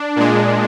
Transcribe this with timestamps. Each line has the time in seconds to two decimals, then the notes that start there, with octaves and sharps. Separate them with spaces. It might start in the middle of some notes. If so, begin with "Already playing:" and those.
Already playing: D4
0.16 A#2 G#3